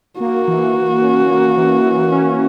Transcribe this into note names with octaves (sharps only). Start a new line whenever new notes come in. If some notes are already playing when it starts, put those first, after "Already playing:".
A#3 F#4
E3
E3
C#4
A#3
E3
E3
C#4